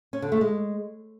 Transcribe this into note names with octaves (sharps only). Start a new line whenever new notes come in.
C#4
D3
A3
G#3